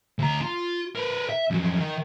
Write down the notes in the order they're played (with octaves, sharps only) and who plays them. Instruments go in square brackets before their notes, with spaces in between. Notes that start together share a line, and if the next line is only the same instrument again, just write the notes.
[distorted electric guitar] D2 A#5
F4
A#4 B4
E5
F2 F#3
D#3